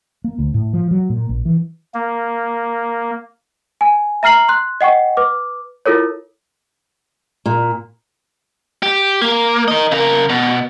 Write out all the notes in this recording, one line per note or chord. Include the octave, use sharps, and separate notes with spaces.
A#3
D2
A2
F3
F#3
A#2
A#1
E3
A#3
G#5
E5 A#5 F6 C7 F#7
C6 F#6
D#5 F#5 G5 C#6
B4 D6
E4 F4 A4 A#4 C#5
A#2
G4
A#3
A#4 D#5
C#3 A#4
B2